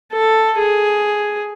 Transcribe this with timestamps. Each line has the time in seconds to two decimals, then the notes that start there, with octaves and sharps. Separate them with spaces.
0.12 A4
0.58 G#4